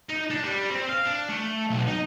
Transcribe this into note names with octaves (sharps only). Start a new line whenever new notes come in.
D#4
D4
G3
C4
F5
D4
A3
B1
D#4